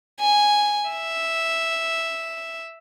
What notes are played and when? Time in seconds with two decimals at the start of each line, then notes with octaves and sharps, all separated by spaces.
0.20 G#5
0.91 E5